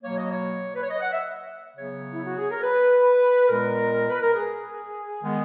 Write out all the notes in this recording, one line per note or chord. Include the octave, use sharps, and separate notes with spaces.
B2 F#3 A#3 C#5
D#5
C#5
B4
C#5
D#5
F#5
E5
C#3 F#3 B3 C#5
E4
F#4
G#4
A#4
B4
A#2 G#3 B3 A#4
B4
A#4
G#4
D#3 G#3 B3